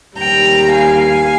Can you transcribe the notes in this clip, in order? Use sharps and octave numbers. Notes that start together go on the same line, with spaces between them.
D#2 D#3 G3 G5 A#5
F5 G#5